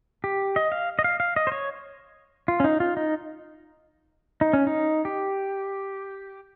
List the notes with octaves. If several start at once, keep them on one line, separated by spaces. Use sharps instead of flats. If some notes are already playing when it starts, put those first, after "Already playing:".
G4
D#5
F5
D#5
F5
F5
D#5
C5
C#5
F4
C#4
D#4
F4
D#4
D#4
C#4
D#4
G4